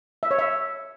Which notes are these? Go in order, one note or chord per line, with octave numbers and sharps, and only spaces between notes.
E5
C#5
E5